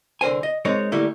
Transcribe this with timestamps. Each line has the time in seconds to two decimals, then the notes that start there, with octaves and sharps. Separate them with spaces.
0.21 C2 D3 A#4 C5 G#5
0.43 D#5
0.65 G#3 C4 D#4 A#4 C#5
0.92 D3 G3 A3 A#3 E4